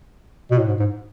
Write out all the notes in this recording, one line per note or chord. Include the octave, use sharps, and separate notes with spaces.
B2
A2
G#2
G#2